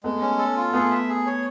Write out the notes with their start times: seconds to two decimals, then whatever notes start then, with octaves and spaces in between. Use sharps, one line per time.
0.03 G#3 A3 B3
0.22 C#4
0.39 A4
0.56 F4
0.73 A3 B3 G#4
0.91 E5
1.09 G#4
1.26 C#5